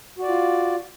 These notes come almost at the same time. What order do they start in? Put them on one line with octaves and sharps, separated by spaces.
F#4 D5 F4